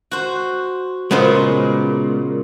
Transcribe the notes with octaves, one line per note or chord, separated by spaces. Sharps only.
F#4 C5
A#2 C#3 G#3 B3 C5